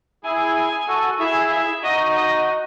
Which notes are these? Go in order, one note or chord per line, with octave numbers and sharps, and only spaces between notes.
E4 G#4 G#5
G#5
F#4 A4
E4 G#4 E5
E5
D#4 F#4 D#5
D#5